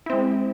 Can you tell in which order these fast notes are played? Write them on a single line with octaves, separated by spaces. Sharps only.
E4 C4 G#3